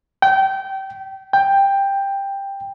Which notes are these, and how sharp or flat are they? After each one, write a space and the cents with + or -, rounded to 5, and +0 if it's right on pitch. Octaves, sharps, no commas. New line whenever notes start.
G5 -25
G5 +10